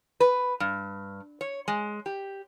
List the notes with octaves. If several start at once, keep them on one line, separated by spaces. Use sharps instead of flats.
B4
G2
C#5
G#3
G4